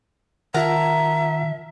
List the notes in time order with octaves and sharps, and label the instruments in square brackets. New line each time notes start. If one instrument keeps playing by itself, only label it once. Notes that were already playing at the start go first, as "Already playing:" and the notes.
[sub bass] D#3 [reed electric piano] F4 F#5 [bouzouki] A#4 A5 A#5 [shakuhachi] E5